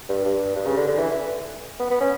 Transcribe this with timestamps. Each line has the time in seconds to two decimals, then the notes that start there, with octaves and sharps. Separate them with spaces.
0.09 G2
0.25 G2
0.56 G2
0.66 C#3
0.77 D3
0.87 D3
0.98 E3
1.79 B3
1.90 B3
2.00 C#4